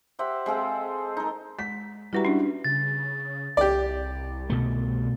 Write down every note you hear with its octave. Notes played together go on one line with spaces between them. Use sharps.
G4 C5 E5 F#5
G#3 C4 A4 F5
D#4 A#4
G#3 B6
G3 E4 F#4 G4 B4 A#5
C#4 D4
C#3 A6
C2 G4 D5
B2 A3